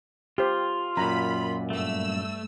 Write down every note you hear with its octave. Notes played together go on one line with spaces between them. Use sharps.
F4 G4 C5
F#2 A#2 A#5 B5
G2 A3 E6